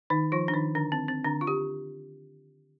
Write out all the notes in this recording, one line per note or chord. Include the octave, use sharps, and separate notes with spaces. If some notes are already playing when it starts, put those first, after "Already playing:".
D#3 D#4
F3 F4
D4
D#3 D#4
D3 D4
C4
C4
D3 D4
F4
G4